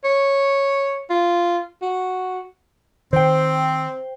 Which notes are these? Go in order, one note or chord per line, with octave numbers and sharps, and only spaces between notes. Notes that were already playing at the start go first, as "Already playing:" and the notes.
C#5
F4
F#4
D#3 C4 C5 G5